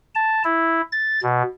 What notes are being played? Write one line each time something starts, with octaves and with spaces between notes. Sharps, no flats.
A5
E4
A6
B2